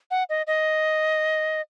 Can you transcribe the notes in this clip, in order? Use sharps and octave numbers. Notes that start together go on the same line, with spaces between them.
F#5
D#5
D#5